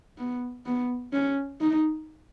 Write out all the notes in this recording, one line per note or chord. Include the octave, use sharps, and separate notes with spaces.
B3
B3
C#4
D#4